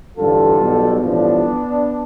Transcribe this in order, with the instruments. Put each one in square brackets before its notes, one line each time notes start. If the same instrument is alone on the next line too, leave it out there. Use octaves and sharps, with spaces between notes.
[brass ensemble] A1 G2 D3 G3 F4 A4
B1 B2 G3
A1 G2 F3 B3 D4